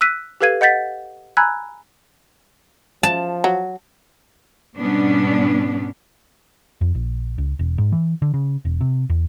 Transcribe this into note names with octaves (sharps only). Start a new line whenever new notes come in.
E6 F#6 B6 D#7
G4 A4 B4 F5 G#6 D#7
D#5 F#5 G6 A6 B6
G#5 A#5 B5 E6 F#6 G#6
F3 A5
F#3
G#2 B2 G3 B3 C#4 D4
F2
A#1
C#2
E1
G#2
E3
D3
C#3
E1
C3
E2